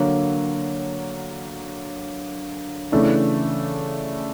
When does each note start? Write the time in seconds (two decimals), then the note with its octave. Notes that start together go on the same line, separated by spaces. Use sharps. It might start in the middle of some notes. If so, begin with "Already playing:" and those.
Already playing: D3 F#3 A#3
2.92 C#3 E3 A3 D4